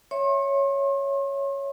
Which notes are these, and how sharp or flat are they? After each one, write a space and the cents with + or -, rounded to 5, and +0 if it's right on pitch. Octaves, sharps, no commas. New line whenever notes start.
C#5 +0 E5 +0 C6 +45